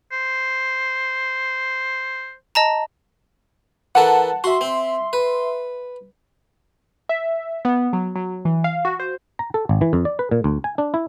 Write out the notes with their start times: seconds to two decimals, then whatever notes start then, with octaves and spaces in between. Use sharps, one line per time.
0.12 C5
2.55 D#5 A5 A#5
3.95 E3 A4 A#4 F#5 A5
4.44 F#4 E5 C6
4.61 C4
5.13 B4
7.09 E5
7.65 B3
7.93 F#3
8.15 F#3
8.45 E3
8.64 F5
8.85 F#4
9.00 C5
9.39 A#5
9.54 A4
9.69 G#1
9.81 E3
9.93 F2
10.05 D5
10.19 B4
10.31 A#2
10.44 D2
10.64 G#5
10.78 D4
10.94 E4